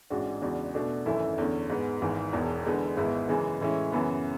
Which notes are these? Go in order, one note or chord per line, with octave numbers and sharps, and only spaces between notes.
A1 G#2 G#3 D4 F#4
E2 C#3 G#3 D4 F#4
B2 A3 D4 F#4
G#1 F#2 E3 A3 E4
E2 D3 A3 C#4
G#2 G#3 B3
G#1 G#2 E3
E1 E2 B2
E2 D3 G#3 B3
G#1 G#2 G#3 B3 E4
F#2 C#3 E3 G#3
A2 E3 G#3 C#4 E4
F#2 C#3 E3 B3